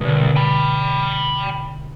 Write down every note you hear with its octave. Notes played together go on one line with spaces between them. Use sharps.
C2 B2 D3
G5 B5